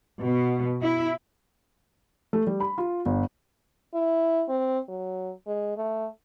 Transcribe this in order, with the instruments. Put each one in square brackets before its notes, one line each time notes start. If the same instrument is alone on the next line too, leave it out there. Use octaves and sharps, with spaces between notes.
[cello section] B2
E4
[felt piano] A3
G3
B5
F4
G1
[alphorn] E4
C4
F#3
G#3
A3